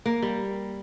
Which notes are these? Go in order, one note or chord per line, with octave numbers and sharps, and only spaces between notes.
A#3
G3